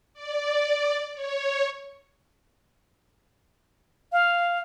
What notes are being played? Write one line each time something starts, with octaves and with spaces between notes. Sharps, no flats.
D5
C#5
F5